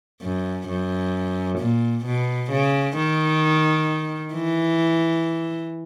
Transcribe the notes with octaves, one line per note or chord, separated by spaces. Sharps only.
F#2
F#2
A#2
B2
C#3
D#3
E3